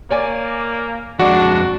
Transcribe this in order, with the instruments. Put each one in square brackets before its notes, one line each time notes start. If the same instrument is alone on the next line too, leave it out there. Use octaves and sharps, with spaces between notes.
[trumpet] A#3 [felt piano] C#5 D5 G#5
[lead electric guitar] F2 G#3 [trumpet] D4 [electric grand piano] F#4 [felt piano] D5 F#5